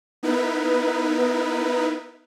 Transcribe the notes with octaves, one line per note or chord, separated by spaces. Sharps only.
B3 D#4 E4 A#4 B4